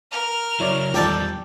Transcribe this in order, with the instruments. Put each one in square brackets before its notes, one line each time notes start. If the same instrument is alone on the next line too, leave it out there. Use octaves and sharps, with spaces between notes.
[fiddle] A#4 F6
[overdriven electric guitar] C#3 F#3 [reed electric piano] E4 C#5 D5
[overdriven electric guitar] E2 G3 [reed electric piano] D#3 F3 [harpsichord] G4 A4 D5